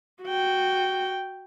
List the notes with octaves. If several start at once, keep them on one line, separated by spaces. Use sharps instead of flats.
F#4 G5